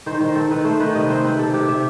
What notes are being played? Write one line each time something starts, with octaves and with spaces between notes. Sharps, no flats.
D#3 C5
D#3 C5
C4 A4
D#3 B4
A3 C5
D#3 B4
C3 D#5
C4 C5
C4 B4
C3 A4
C3 G4
C3 E5